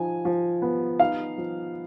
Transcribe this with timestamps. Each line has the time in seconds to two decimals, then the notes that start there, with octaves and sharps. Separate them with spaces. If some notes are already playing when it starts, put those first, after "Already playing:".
Already playing: F3 D#4 G#5
0.25 F3
0.62 B3
0.99 D#4 F5
1.38 F3